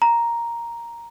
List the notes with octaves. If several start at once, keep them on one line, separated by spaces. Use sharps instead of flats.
A#5